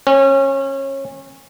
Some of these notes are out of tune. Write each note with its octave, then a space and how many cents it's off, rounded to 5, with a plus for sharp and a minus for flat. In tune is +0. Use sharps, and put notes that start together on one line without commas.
C#4 -25